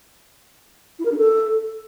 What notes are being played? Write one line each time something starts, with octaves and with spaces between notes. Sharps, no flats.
E4
A#4
D4
A4